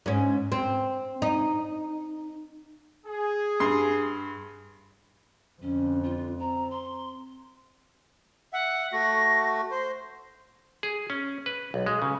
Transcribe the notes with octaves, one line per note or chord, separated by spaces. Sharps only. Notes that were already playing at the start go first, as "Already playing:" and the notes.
G#2 C#4
C4
D#4
G#4
G2 C6 C7
F2 D3 C#4
F4
C4 A#5
C6
E5 F#5
A3 F#4 A#6
C5 C6
G#4
C#4
B4
B1
G#3
C#3